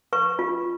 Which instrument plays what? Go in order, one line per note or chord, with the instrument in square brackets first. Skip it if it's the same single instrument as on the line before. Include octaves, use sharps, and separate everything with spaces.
[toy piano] B4 C#6
F4